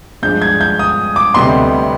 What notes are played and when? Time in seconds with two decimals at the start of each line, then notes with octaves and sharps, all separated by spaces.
0.22 G2 F3 G#3 D4 G6
0.42 G#6
0.61 G6
0.79 D#6
1.16 D6
1.34 D2 C3 G3 B3 D#4 C6